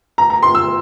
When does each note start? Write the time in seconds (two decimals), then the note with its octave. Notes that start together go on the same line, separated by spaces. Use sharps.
0.18 A#5
0.30 A#5
0.43 C6
0.55 E6